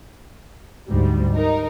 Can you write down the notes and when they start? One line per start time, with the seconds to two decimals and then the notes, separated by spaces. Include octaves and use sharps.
0.88 D2 G#2 G3
1.35 D#4 A#4